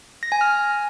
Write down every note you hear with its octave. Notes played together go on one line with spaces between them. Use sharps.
A#6
G#5
F6